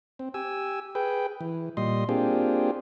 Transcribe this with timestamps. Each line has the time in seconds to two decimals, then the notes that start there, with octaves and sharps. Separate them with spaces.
0.19 C4
0.34 G4 G#5 E6
0.95 G#4 B4 G5
1.41 E3
1.77 A#2 G3 D#5 C6
2.09 A#3 C4 D4 F4 G4 G#4